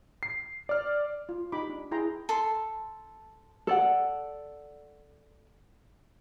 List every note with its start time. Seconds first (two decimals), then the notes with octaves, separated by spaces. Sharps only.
0.23 C7
0.69 D5 F6
1.29 F4
1.52 D#4 G4 B5 D6
1.69 D4
1.91 E4 G#4 G5 A#5 C6
2.29 A4 C6
3.67 A4 D5 F#5